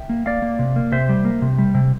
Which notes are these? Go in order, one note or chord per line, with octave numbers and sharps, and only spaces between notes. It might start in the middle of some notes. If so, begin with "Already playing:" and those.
Already playing: E5 G5
A#3
A#3 D5 F5
A#3
C3
A#3
C3 C5 E5
G3
A#3
C3
G3
C3